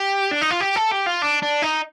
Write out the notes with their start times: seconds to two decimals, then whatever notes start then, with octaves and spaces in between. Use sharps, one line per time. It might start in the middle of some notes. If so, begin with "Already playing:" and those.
Already playing: G4
0.31 D4
0.41 D#4
0.51 F4
0.60 G4
0.76 A4
0.91 G4
1.06 F4
1.22 D4
1.42 D4
1.62 D#4